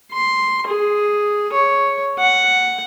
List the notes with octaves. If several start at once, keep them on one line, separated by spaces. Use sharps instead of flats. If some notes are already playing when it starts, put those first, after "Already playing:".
C6
G#4
C#5
F#5